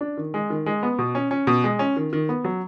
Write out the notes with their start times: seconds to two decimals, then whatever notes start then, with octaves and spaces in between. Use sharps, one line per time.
0.01 D4
0.17 D#3
0.34 G#3
0.50 D#3
0.66 G#3
0.83 B3
0.99 B2
1.15 C#4
1.31 C#4
1.47 B2
1.64 G#3
1.79 C#4
1.97 D#3
2.13 D#3
2.29 B3
2.44 F#3